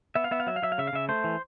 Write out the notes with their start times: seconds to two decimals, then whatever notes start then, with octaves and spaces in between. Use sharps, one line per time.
0.15 B3 E5
0.24 F5
0.31 B3 E5
0.40 F5
0.47 F#3 E5
0.56 F5
0.62 F#3 E5
0.72 F5
0.78 C#3 E5
0.87 F5
0.93 C#3 E5
1.09 A3 C5
1.24 E3